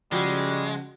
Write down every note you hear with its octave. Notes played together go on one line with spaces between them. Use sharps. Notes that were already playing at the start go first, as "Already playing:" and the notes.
C#3 F3 G3 G#3 F#4